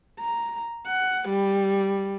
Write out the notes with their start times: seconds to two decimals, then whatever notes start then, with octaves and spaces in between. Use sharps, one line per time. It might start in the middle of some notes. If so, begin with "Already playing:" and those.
0.20 A#5
0.87 F#5
1.29 G3